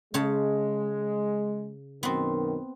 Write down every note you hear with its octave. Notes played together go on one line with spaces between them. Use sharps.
C#3 G#3 C#5 A5
F#2 B2 D#3 B3 C4